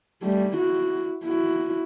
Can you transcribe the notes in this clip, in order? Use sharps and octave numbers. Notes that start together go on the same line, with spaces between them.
G3 A3
E4 F#4
E4 F#4